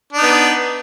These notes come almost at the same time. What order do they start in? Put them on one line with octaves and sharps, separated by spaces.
D4 D#4 B3